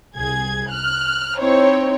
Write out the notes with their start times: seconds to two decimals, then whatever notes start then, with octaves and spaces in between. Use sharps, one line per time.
0.17 C2 G#4 G#6
0.70 F6 F#6
1.39 C4 D#4 E4 C5 C#5